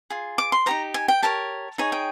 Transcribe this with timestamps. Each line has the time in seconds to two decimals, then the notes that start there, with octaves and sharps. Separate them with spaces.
0.10 F4 G#4
0.38 D6
0.52 C6
0.66 D#4 G4 C5 A#5
0.94 G#5
1.08 G5
1.22 G4 A#4 C#5 A5
1.78 D#4 G#4 C#5 G#5
1.92 G5